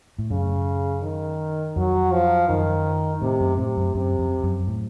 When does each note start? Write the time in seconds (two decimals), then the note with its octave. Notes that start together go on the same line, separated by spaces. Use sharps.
0.19 A2
0.30 F#2 C#3
1.03 D#3
1.76 F2 F#3
2.12 F3
2.48 F#2 D#3
3.22 A2 C3
3.40 F#2
3.58 A2 C3
3.77 F#2
3.95 F#2 C3
4.19 F2
4.44 F#2
4.67 A2